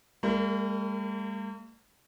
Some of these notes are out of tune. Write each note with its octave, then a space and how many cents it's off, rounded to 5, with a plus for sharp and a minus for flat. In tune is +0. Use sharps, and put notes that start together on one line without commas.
G3 +45 A#3 -45 A#4 -10